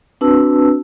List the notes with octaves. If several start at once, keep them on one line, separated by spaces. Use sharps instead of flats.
C4 D4 F#4 B4 A5 E6